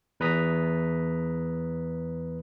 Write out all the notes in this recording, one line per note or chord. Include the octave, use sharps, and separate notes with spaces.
E2 B4 A#5 D#6 B6